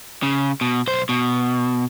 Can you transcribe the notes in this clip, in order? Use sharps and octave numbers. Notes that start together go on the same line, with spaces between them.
C#3
B2
B1 C5
B2